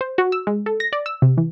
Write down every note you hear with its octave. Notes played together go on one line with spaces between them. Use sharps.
C5
F#4
E6
G#3
A4
A#6
D5
E6
C3
E3